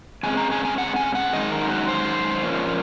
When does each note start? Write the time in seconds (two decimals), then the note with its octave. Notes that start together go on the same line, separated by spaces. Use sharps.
0.23 F2 C#3 G#3 C4 G#5
0.37 A#5
0.51 G#5
0.65 G#5
0.78 F#5
0.96 G#5
1.15 F#5
1.33 F#2 D#3 G#3 D#4 D#5
1.52 A#4
1.70 F#4
1.88 C5
2.43 A#2 F3 A#3 C#4